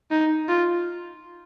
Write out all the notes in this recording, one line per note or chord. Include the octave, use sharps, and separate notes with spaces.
D#4
F4